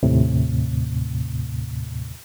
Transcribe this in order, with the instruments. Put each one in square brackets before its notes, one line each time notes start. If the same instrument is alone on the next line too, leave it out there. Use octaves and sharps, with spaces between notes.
[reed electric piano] D#2 A2 C3